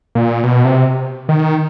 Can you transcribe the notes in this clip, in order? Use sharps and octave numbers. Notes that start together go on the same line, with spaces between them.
A#2
B2
C3
D#3